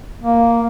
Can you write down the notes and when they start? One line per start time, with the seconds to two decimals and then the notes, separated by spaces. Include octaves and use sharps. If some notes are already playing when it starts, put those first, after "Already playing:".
0.21 A#3